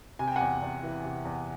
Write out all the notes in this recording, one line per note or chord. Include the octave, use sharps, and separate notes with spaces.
C3 G#5
G5
E2 F#5 G#5
E2
E3
C3
E2